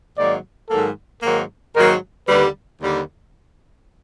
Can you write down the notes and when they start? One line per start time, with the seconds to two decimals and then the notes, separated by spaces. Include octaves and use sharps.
0.17 G#2 D#3 F#3 A#3 D5
0.70 G#2 D#3 F#3 A#3 A4
1.23 G#2 D#3 F#3 A#3 A#4
1.75 G#2 D#3 F#3 A#3 A#4
2.28 D#2 D3 G3 B4
2.81 D#2 D3 G3